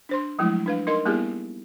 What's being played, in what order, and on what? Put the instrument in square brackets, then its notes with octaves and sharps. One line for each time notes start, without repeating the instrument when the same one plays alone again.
[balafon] D4 C5 C6
F3 F#3 G#3 A3 E4
D4 B4 F5
D#4 A#4 D#5 C6
G3 A#3 B3 E4 G4 G#4